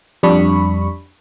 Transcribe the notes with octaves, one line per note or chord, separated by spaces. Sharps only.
F2 G3 D4 B5 C#6